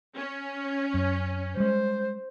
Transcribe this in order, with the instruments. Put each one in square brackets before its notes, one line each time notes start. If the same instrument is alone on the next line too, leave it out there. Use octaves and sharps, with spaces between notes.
[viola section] C#4
[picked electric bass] F#2
[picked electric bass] G3 G#3 [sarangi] C5